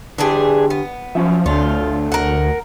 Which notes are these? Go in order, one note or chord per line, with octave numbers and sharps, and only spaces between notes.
D3 E3 D4 G4 G#4
B3
F3 F#3 C#4 E5
D2 A3 D4 F4 C#5
A#4 F#5